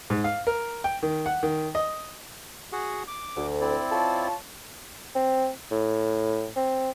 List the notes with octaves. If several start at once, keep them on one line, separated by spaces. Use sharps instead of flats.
G#2
F5
A#4
G5
D#3
F#5
D#3
D#5
F#4 G#4 F#5
D6
D2
C4 E4 D5
F4 C#5 A5
C4
A2
C4